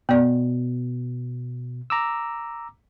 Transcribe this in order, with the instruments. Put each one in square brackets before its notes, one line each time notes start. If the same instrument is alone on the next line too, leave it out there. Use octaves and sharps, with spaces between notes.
[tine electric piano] B2 [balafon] B3 D5
[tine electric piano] A#5 D6 E6